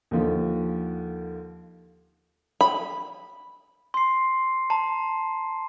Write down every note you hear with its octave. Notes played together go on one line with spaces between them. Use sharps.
D#2 D3 F3
B5
C6 C7
A5 A#5